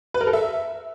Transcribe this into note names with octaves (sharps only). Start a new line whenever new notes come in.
B4
A#4
A4
E5